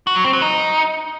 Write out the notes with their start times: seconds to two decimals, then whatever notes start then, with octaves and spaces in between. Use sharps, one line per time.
0.07 F#4
0.16 F#3
0.24 C4
0.33 F#3
0.42 D#4